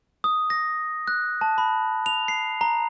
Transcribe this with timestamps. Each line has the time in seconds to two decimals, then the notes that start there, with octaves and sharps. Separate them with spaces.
0.24 D#6
0.50 A#6
1.08 F#6
1.41 A5
1.58 B5
2.06 F7
2.28 C7
2.61 A#5